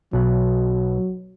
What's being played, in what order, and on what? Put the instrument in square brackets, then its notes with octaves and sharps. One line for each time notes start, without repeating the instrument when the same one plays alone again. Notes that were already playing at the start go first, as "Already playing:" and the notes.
[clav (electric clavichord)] B1 B2 F#5 [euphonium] F#3